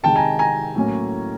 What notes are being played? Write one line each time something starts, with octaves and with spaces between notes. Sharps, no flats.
C3 D#3 G#3 G5 A5
G#5 A#5
G#5 A#5
A2 F#3 A#3 C#4